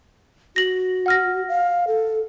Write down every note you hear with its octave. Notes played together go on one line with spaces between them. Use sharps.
F#4 A#6 F#7
F#5 F6 A#6
F5
A4